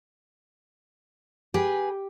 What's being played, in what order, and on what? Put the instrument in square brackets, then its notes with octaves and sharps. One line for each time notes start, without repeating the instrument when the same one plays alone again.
[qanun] G4 [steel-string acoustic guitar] G#4 B4